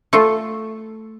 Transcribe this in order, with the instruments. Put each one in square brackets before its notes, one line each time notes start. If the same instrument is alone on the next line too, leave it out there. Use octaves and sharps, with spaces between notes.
[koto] A3 F4 A4